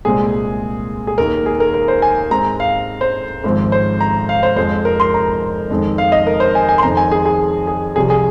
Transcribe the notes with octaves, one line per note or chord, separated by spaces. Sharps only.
C2 A#2 G#3 C4 G#4
G#4
D#2 D#3 A#3 A#4
G#4
A#4
A#4
C5
G#5
G#2 G#3 C4 A#5
F5
C5
G#1 G#2 F3 C4
C5
A#5
F5
C5
F2 F3 G#3 C4 C5
A#4
C6
A#5
F2 D#3 G#3 C4
F5
D#5
A#4
C5
G#5
G#5
C6
F2 D#3 C4 A#5
G#5
G#4
G#4
G#4
C2 C3 F3 G#4
G#4